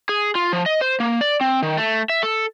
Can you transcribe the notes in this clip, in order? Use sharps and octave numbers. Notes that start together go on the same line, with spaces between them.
G#4
F4
F3
D#5
C5
A#3
D5
C4
D#3
A3
E5
A4